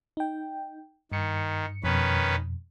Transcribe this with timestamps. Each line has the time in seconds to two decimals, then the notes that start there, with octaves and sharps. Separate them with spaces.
0.17 D#4 G5
1.12 G2 D#3 C#7
1.84 F2 B2 D#3 C#4 B4